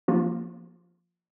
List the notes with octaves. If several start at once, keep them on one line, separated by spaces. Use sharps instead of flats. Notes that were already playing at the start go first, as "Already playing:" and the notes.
F3 A#3 F4